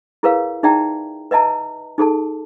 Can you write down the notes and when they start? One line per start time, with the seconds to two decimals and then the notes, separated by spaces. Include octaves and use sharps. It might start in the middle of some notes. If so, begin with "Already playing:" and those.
0.23 E4 G#4 A#4 B4 C#5 F5
0.63 D#4 G#4 D5 E5 G5 A#5
1.31 B4 D#5 E5 A5 A#5
1.98 D#4 G#4 A4 A5